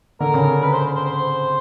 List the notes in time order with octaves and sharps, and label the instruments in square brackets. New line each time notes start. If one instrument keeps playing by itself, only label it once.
[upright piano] D3 [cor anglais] A#4
[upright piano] C#3
[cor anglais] B4
C5
C5
C5